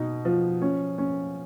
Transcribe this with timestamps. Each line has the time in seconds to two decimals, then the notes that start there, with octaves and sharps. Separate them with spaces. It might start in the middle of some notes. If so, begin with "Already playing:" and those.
Already playing: B2 D#4
0.25 F3
0.62 C#4
0.98 C#4